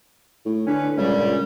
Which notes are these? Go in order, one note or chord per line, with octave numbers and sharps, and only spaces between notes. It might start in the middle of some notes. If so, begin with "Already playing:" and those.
A2
D3 C#4 B4
C#2 F#2 A#2 G3